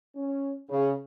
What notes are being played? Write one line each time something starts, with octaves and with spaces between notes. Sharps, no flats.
C#4
C#3